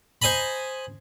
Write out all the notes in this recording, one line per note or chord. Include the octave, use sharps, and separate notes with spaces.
C5 D#5 G#5 A#5 B5